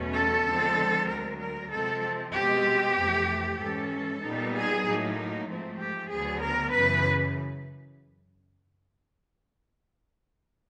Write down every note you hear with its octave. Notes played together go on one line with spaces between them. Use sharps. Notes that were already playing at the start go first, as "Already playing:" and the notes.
Already playing: E2 B2 F#3 A3 C#4
A4
D3 F3 G#3 C4
D2 D3 F#3 A#4
A#4
C3 F3 G#3 C4 A4
B2 G#3 C4 G4
F2 C3 E3 A3
G#2 E3 G#3 C#4 A4
A#2 G3 B3 D#4
G#4
A2 F#3 A#3 D#4
G#2 F3 A3 C4
G4
D2 D3 F#3 B3 G#4
A#4
F#2 C#3 E3 B4